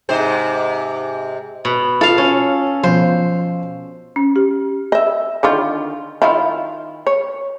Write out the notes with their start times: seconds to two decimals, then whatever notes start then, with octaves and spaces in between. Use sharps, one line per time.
0.09 G#2 C3 C5
1.65 B2
2.01 F4 A4 F5
2.18 C#4
2.83 B2 F3 C5
4.16 C#4
4.36 G4
4.92 D#5 E5
5.43 D3 D#3 F4
6.22 D#3 E4 F4
7.07 C#5